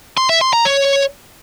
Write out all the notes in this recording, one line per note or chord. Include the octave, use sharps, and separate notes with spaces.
C6
E5
C6
A#5
C#5